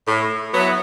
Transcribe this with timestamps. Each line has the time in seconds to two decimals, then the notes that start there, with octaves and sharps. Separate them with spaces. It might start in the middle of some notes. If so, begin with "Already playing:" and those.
0.07 A2
0.53 F#3 B3 E4